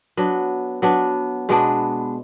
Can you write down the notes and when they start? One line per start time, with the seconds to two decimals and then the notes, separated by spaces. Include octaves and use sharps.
0.17 F#3 B3 D4
0.82 F#3 B3 D4
1.49 B2 G#3 B3 D4